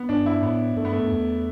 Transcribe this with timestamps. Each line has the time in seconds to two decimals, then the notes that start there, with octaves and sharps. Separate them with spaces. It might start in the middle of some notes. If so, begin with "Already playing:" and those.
Already playing: B3
0.09 G2 D4
0.26 E4
0.42 A2 B3
0.76 G2 A3
0.85 B3
0.93 A3
1.00 G2
1.10 E2